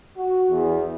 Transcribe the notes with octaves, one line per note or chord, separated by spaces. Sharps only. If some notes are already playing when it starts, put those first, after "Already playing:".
F#4
E2